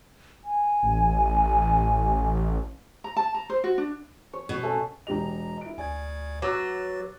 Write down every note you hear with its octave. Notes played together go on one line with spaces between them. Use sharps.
G#5
A1
A#5
A5
A#5
C5
F#4
D4
C#5
B2
A3 C#4 A4
E1 G4 D#5 A#5 F7
E4 D7
D2 D5 G#5 G#6
F#3 B4 D6 E6 F#6 A6